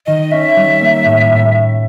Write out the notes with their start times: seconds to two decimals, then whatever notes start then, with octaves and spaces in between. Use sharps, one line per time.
0.07 D#3 D#5
0.31 C#4 E5
0.56 G3
0.81 A#3
1.05 A2
1.31 A2